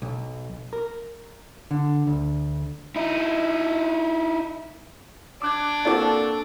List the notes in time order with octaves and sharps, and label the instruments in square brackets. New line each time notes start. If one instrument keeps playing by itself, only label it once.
[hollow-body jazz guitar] B1
A#4
D3
D2
[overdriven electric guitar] D#4 E4
[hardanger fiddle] D4 [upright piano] D6 F#6 G#6
[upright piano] A#3 C4 F#4 [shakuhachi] A4 [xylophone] D5 D6